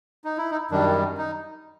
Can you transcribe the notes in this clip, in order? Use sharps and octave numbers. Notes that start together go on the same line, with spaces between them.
D#4
E4
D#4
F#2 D#3 G3 D4
D#4